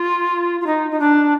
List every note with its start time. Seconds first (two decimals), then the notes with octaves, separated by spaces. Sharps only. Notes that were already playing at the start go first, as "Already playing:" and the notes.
Already playing: F4
0.61 F4
0.67 D#4
0.91 D#4
1.00 D4